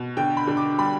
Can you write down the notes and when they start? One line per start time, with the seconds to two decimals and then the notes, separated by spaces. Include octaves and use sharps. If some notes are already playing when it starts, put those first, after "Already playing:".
Already playing: B2
0.17 D3 G5
0.37 B5
0.47 D3
0.57 D6
0.78 G3 B5